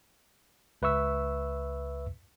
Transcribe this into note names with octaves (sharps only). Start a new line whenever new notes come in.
C#2 B4 E5 C#6 E6